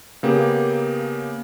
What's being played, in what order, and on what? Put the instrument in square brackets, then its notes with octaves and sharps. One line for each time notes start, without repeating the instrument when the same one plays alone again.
[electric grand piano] C#3 A#3 B3 G4